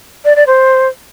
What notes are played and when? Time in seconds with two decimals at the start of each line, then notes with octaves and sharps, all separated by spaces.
0.25 D5
0.36 D5
0.47 C5